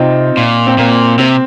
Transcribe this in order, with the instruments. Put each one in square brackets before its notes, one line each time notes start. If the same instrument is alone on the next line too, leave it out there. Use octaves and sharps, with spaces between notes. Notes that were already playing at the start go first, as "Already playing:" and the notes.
Already playing: [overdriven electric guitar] C3 [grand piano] C4 D#4 F4
[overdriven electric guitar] A#2
[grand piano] C4
[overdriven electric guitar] A#2 [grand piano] A#3
[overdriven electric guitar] C3 [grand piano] C4